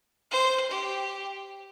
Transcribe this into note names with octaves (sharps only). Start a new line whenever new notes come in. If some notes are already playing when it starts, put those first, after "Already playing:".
C5
G4